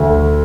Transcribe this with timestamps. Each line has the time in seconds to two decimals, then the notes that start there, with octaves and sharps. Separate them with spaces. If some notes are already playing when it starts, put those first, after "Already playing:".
Already playing: D2